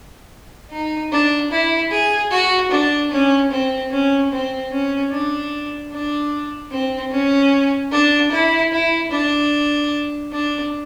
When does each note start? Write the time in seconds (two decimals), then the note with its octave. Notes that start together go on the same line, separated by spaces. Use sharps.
0.71 D#4
1.12 D4
1.51 E4
1.91 G#4
2.31 F#4
2.71 D4
3.11 C#4
3.51 C4
3.91 C#4
4.31 C4
4.71 C#4
5.11 D4
5.92 D4
6.71 C4
7.11 C#4
7.92 D4
8.32 E4
8.72 E4
9.11 D4
10.32 D4